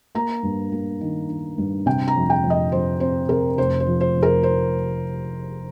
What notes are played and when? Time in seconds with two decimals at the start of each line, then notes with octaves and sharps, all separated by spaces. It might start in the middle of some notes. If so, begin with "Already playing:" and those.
0.15 A#3 A#5
0.43 G2
0.72 A#3
1.01 D#3
1.29 D#3
1.58 G2
1.86 C3 G5
2.08 A#5
2.16 F2
2.30 G5
2.43 F2
2.50 D#5
2.72 F2 C5
3.00 C4 C5
3.29 C3 A#4
3.58 F1 C5
3.80 C5
3.86 F3
4.00 C5
4.15 F1
4.23 A#4
4.43 C5